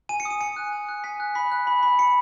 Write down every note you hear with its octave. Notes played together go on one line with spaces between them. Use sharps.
G#5 D#7
C#7
D#6
D#7
G#5 C#7
F#6
G#5
F#6
G#5 B6
F#6
B5 B6
F#6
B5
B5
B5 C#7